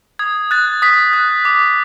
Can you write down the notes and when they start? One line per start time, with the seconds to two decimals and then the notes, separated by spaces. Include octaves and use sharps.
0.19 D#6 G#6
0.51 F#6 A6
0.82 D#6 B6
1.13 F#6
1.45 D6